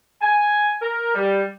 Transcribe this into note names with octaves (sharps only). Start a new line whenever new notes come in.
G#5
A#4
G3